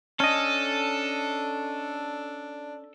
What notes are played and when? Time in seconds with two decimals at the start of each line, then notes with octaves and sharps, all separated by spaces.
0.20 C#4 D4 A4 D#5